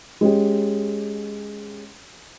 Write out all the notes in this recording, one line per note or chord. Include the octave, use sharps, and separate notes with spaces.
G#3 C#4 G4